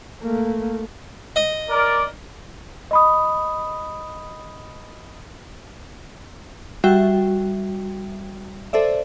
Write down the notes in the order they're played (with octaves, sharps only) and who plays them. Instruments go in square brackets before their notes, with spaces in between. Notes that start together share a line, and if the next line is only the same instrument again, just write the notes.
[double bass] A3 A#3
[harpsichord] D#5
[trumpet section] A#4 D5
[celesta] D#5 B5 D#6
[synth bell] G3 F#4 E5 G5
A4 C5 D5 E5